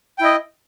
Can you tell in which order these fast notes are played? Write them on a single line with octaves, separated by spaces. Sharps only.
G5 E4 D#5